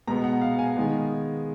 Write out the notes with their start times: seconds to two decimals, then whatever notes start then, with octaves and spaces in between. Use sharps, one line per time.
0.07 B2 G#3 B3 A#5
0.24 F#5
0.42 F5
0.59 G#5
0.76 D#3 G#3 B3